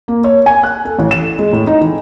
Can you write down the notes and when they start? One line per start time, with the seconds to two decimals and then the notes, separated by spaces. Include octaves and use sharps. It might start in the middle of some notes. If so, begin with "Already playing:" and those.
0.08 A#3
0.24 C#5
0.46 G#5
0.63 F#6
0.85 A4
0.99 A1
1.11 E7
1.39 G#3
1.53 A2
1.67 D#4
1.81 E3